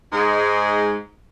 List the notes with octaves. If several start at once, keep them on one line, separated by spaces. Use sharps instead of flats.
G#2 G#3